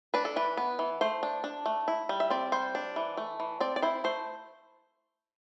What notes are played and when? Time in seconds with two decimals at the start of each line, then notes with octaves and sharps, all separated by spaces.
0.14 D4 B4
0.25 A4
0.36 E3 B4
0.57 B3
0.79 E3
1.01 A3 C5
1.23 D4
1.44 D4
1.66 A3
1.88 E4
2.09 G3
2.20 E5
2.30 C4 D5
2.52 G3 C5
2.75 D4
2.96 E3
3.17 A3
3.40 E3
3.60 C4 D5
3.76 D5
3.82 E4 C5
4.04 A3 C5